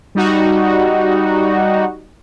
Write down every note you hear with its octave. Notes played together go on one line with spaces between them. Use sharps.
G3 D#4 F#4